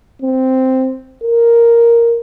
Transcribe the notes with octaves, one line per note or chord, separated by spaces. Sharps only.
C4
A#4